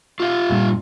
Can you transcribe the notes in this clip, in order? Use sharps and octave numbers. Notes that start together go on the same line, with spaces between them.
F4 G4 F5
G2 A#2